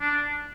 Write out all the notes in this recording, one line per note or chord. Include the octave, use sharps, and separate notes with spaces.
D4